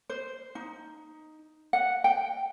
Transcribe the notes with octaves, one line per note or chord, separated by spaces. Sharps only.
C5
D#4
F#5
G5